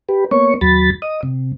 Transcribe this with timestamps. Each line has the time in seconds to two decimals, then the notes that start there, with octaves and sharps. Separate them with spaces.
0.09 G4 B4
0.31 A#3 B3 C#5 C#6
0.61 D#2 F#3 B5 A6
1.02 D#5 D#6
1.23 C3